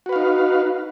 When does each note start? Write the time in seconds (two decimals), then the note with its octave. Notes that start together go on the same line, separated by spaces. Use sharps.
0.06 F#4
0.09 B4
0.13 F5
0.16 D#4